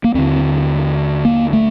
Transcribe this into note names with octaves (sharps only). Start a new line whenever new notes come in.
A#3
D#2 D3 C4
A#3
A3